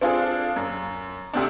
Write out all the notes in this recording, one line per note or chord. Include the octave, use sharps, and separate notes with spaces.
C4 D4 F4 G#4 A4
F#2
D2 C3 D4